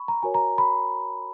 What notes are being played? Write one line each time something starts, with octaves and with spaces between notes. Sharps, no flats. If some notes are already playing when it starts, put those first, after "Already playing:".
Already playing: B5 C#6
A#5
F#4 A#4 C#5 G#5
A#5
B5